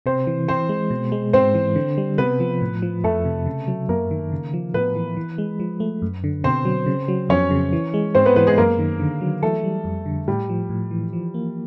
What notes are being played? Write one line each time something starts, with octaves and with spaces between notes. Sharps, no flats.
C3 C4 C5
E3
E3 C4 C5
G#3
B2
G#3
G#2 C4 C5
E3
D3
G3
C3 B3 B4
F3
A2
F3
F2 A3 A4
C3
C#3
F#3
F#2 A#3 A#4
D#3
C#3
F3
A2 B3 B4
E3
E3
G#3
F3
A3
F#2
D3
B2 C4 C5
F#3
C#3
F#3
F2 C#4 C#5
C#3
E3
G#3
G#2 C4 C5
B3 B4
E3 B3 B4
G#3 G#4
F#2 A#3 A#4
D#3
D3
F#3
E3 A3 A4
G3
F2
D3
A2 G3 G4
F3
A2
E3
F3
A#3